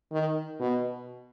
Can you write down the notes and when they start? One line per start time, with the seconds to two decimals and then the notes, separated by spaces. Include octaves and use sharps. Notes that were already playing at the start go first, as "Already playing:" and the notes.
0.12 D#3
0.60 B2